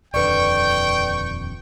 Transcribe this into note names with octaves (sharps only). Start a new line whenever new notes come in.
D#1 F2 D3 B4 D5 G5 C#6